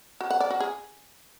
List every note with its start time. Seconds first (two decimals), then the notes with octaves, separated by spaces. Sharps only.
0.21 F#4
0.31 F#5
0.40 D5
0.50 F#4
0.60 G#4